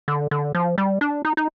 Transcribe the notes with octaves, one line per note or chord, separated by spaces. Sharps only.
D3
D3
F3
G3
D4
D#4
D#4